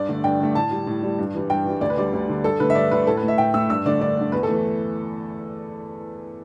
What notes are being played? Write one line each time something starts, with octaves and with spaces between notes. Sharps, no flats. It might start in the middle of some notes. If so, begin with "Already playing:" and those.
Already playing: G2 D5
D3 A3
G2 G5
D3 A3
A2 A5
G3
A2
G3
G2
E3 G3
G2 G5
E3 G3
D2 D5
B4
D3 G3 D5
D2
D3 G3
G2 A4
D3 A3 B4
E5
G2 D5
D3 A3 B4
A2 A4
B4
A3
E5
A2 G5
A3 E6
G2 E6
D3 A3 D5
G2 D5
D3 A3
E2 B4
A4
E3 A3